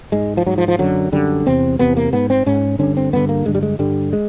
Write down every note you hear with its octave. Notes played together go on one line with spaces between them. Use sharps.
G#2 G#3
F3
G#2 F#3
F3
F3
F#2 D3 F#3
F#2 D3 G3
E2 C3 C4
E2 C3 B3
A#3
G#2 B3
C4
G#2 C#4
G2 D3 C#4
C4
G2 D3 B3
A#3
G2 D3 G#3
G3
G#3
G2 D3 G3
G#3